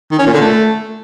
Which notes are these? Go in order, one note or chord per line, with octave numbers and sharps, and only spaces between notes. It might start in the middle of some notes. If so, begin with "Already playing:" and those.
D#3
C#4
A#2
D3
A3